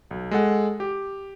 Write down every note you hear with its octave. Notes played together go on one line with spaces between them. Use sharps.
B1
G#3 A4 F#5
G4